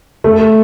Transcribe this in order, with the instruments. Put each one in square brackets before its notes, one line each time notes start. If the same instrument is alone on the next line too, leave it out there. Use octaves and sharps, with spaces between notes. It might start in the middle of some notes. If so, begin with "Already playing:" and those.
[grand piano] A3